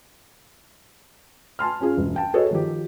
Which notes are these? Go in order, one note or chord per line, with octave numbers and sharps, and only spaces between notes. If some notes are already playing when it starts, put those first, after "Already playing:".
G#5 A5 C6 F6
C#4 F4 G#4
E1
G5 A5
F#4 G#4 A4 B4 C#5 D#5
D#3 F3 G4